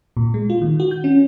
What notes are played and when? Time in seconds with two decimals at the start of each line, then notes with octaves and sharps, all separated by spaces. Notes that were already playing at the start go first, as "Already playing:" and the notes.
0.17 A#2
0.34 G#3
0.50 F4
0.61 D#3
0.80 F#4
0.91 G6
1.04 C#4